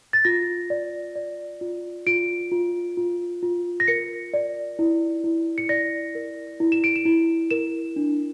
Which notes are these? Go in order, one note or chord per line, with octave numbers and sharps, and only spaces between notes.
A6
F4 A#6
D5
D5
F4
F4 D7
F4
F4
F4
A#6
A#4 C#7
D5
E4
E4
C#7
D5 A#6
A#4
E4
E7
D7
E7
E4
A#4 E7
D4